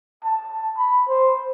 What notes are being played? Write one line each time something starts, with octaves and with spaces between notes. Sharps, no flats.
A5
B5
C5